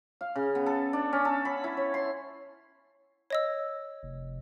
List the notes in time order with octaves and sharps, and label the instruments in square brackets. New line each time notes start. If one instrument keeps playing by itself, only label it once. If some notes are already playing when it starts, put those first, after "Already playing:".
[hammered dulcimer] F5
C#3
B3
A4
D4
C#4
A4
B5
E4
C#5
C6
[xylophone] C#5 D#5 E6
[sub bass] F1